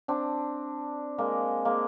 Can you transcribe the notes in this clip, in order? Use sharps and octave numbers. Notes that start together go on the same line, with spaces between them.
C4 D4
G#3 A#3
G#3 A#3